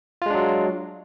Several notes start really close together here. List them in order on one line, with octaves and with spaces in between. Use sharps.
F4 G#3 D4 F#3